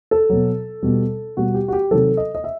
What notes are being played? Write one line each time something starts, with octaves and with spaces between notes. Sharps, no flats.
A4
B2 F#3
B2 G3
B2 G3 F#4
G4
F#4
G4
C3 D#3 F#3 A4
D#5
D#5
E5